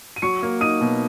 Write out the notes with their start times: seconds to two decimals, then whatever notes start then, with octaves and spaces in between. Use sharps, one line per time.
0.16 D#7
0.22 F#3 C#6 C#7
0.43 A#3
0.61 D#4 D#6 D#7
0.81 B2